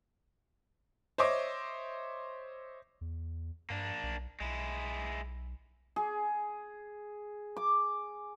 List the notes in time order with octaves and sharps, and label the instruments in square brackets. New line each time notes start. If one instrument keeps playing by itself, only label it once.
[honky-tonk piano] C5 C#5 D#5 E5 C6 D6
[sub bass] E2
[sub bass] G2 [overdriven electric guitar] A#3 D4
[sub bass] B1
[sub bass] B1 [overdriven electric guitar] G#3 E4
[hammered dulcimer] G#4
D6